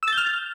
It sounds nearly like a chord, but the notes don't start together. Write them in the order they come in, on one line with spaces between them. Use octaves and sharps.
E6 A6 G6 F6